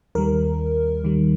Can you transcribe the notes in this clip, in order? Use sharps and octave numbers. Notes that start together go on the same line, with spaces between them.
D#2 D#3 G3 A#4
D#2 D#3 G3